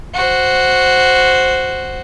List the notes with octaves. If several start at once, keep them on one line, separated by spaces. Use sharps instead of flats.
F#4 C5